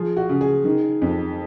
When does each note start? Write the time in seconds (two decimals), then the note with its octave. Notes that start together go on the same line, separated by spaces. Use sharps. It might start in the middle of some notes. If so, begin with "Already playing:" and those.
Already playing: F3 G#4
0.17 F#4
0.29 C#3
0.41 G#4
0.65 D#3
1.02 F2